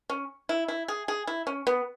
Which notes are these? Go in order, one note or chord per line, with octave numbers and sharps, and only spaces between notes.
C#4
E4
E4
G#4
G#4
E4
C#4
B3